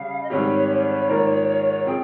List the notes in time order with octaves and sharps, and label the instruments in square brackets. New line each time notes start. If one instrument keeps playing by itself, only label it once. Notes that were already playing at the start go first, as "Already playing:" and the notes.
Already playing: [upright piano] C#3 G3 C#4 [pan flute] F5
[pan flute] D#5
[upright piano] G#2 D#3 G3 C4 G4 [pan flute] C#5
[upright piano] G#2 D#3 A#3 F4 A#4
[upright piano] F3 C4 F4 G#4 [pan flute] G5